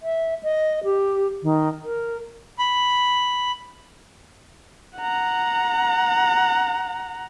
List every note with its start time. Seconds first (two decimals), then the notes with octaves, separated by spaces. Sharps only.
0.03 E5
0.43 D#5
0.84 G4
1.43 D#3
1.84 A#4
2.59 B5
4.97 F#5 A#5